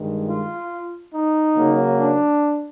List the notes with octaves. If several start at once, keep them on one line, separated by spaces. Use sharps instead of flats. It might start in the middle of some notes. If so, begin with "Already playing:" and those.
Already playing: G2 D#3 G#3
F4
D#4
C#3 F#3 A#3
D4